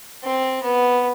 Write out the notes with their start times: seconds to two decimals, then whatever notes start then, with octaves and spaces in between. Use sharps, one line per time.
0.24 C4
0.63 B3